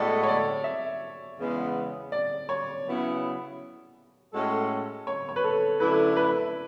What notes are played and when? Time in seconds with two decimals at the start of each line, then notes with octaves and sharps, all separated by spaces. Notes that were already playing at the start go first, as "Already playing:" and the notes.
Already playing: A2 G#3 B3 F#4 A4 D5
0.23 C#5
0.28 D5
0.64 E5
1.38 E2 C#3 G#3 B3
2.12 D5
2.49 C#5
2.85 C#3 F#3 B3 E4
4.33 A2 G#3 C#4 F#4 A4
5.07 C#5
5.29 C#5
5.36 B4
5.44 A4
5.79 F#2 D3 A3 E4 B4
6.16 B4